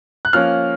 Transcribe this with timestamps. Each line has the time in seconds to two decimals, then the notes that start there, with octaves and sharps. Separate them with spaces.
0.25 F#6
0.33 F3 A#3 C#4 F6